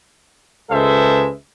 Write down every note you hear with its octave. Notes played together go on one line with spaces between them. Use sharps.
C#2 G#3 A4 B4 C5 E5